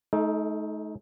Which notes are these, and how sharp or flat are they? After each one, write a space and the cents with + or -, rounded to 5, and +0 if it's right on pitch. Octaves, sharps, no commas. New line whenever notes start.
A3 -40 D#4 +15 A4 +5